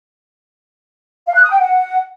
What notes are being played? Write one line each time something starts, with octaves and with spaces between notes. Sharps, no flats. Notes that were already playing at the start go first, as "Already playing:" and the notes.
F5
F#6
D#6
G5
F#5